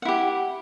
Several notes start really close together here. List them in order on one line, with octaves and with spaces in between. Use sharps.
F#5 E4 G4